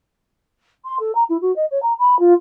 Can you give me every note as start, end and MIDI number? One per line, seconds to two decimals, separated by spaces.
0.85 0.96 84
1.00 1.14 69
1.15 1.24 82
1.29 1.37 64
1.41 1.54 66
1.56 1.66 75
1.71 1.81 73
1.83 1.94 82
1.99 2.18 83
2.19 2.33 65